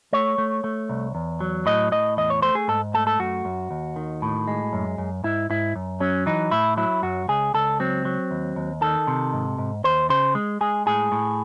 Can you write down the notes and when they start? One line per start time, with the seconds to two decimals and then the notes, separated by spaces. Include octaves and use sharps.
0.13 A3 C#5
0.38 A3
0.64 A3
0.90 C2
1.15 E2
1.40 F#3
1.66 A2 D#5
1.92 A2 D#5
2.17 E2 D#5
2.30 C#5
2.42 A3 C5
2.55 G#4
2.68 G#2 A4
2.94 A3 A4
3.07 A4
3.19 F#2 F#4
3.45 F#2
3.71 D#2
3.96 D#3
4.22 A2
4.48 G#3
4.73 F#2
4.98 F#2
5.24 G#2 E4
5.50 G#2 E4
5.76 F#2
6.00 F#3 C#4
6.26 E3 D#4
6.51 A2 E4
6.77 F#3 E4
7.02 F#2 F#4
7.28 C#2 G#4
7.54 C#2 A4
7.80 F#3 C4
8.05 F#3
8.31 D#2
8.56 D#2
8.81 D#3 A4
9.07 C3
9.33 G#2
9.58 G#2
9.84 D#2 C5
10.10 C#3 C5
10.35 G#3
10.61 G#3 G#4
10.86 A2 G#4
11.12 A2